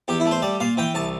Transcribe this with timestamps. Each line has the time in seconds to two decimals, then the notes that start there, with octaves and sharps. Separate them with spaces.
0.08 E2 G4
0.20 E4
0.25 A3
0.31 C5
0.42 G3 D5
0.60 A#2 F5
0.77 E3 G5
0.95 C2 A5